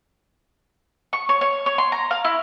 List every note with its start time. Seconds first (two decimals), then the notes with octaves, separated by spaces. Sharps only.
1.13 C#6
1.29 C#5
1.41 C#5
1.66 C#5
1.78 C6
1.92 A#5
2.11 F5
2.24 E4